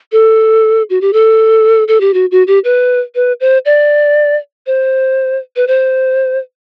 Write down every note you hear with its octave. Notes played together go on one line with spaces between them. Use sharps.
A4
F#4
G4
A4
A4
G4
F#4
F#4
G4
B4
B4
C5
D5
C5
B4
C5